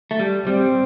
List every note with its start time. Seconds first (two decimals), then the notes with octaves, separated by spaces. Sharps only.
0.11 A3
0.19 G3
0.47 G3 C4